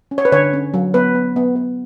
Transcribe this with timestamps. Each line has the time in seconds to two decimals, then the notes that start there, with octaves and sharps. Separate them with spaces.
0.11 C#4
0.18 C#5
0.25 B4
0.32 D3 C#5
0.53 C#4
0.74 F#3
0.94 B3 B4
1.15 B3
1.36 B3
1.56 B3